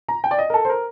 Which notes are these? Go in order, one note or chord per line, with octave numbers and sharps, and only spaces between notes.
A#5
G5
D5
D#5
A#4
A4
C5
A#4